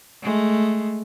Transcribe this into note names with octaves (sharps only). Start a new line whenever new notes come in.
G#3 A3